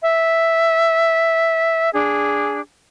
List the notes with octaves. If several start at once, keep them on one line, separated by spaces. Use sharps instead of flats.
E5
D4 G#4